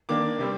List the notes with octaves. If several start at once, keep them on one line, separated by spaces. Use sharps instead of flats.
D#3 A#3 D4 D6
C3 G3 C4